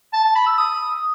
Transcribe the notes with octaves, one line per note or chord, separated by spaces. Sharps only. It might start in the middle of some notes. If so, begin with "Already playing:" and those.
A5
A5
B5
E6
D#6